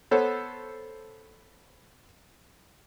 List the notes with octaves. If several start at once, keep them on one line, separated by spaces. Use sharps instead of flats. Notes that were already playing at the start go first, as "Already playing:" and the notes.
B3 A4 C5 C#5